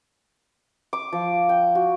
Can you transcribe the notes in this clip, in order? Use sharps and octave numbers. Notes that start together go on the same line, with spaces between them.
D6
F3
G5
F#4